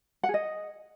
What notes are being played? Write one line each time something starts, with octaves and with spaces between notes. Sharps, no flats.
F#5
G#4
D#5